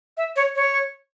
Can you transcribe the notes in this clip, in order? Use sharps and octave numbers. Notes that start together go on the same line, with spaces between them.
E5
C#5
C#5